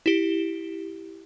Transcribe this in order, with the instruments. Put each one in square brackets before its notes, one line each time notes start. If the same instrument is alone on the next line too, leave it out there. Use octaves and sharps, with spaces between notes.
[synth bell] E4 G4